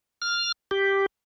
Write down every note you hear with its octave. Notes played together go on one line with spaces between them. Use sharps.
F6
G4